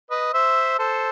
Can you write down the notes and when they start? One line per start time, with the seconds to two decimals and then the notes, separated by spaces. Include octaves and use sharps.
0.11 B4 D#5
0.33 C5 E5
0.79 A4 C5